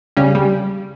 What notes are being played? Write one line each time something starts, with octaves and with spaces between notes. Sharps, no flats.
C#3 G3 C#4
G3